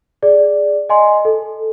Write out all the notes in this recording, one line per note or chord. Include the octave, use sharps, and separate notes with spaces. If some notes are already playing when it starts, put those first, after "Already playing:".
G#4 D5
D#5 G#5 C6
A4